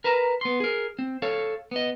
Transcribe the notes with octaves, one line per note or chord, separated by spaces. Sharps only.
A#4 B4 A5 A#5
B3 C6
G#4 A#4
C4
A4 C#5 F5
B3 D#5